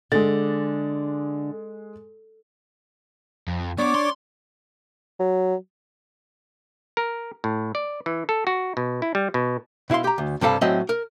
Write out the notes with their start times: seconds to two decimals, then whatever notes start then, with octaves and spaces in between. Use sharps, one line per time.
0.12 D3 G#3 A6
3.48 F2
3.78 B3 D4 C#5 D5 D6
3.95 C6
5.20 F#3
6.97 A#4
7.44 A2
7.75 D5
8.06 E3
8.29 A4
8.47 F#4
8.77 B2
9.02 E4
9.15 G3
9.34 B2
9.90 B2 E4 E5 F5 C6
10.04 G4 A#5
10.18 D2
10.41 G2 C3 G3 A4 F5
10.61 A2 F#3 C4 C#4 D#5 E5
10.89 A#4